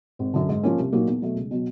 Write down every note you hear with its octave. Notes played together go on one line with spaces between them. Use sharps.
G#1
F#2 D3
G#2
F3 A#3 C#4
C2
A#2 F#3 A#3 D#4
E2
B2 F#3 A3
C#2
B2 F#3